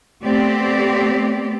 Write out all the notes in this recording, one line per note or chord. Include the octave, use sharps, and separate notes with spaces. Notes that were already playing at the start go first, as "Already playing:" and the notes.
A3 B3 C4 G4 D5